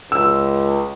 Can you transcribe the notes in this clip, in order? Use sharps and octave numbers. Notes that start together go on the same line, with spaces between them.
C#2 E6